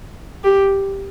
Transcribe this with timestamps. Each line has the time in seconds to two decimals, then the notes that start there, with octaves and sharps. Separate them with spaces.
0.44 G4